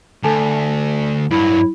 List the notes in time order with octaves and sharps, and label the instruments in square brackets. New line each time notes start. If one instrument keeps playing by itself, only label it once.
[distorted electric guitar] D2 [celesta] A4 G#5 A5
[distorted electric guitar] G2 F#3 [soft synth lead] E4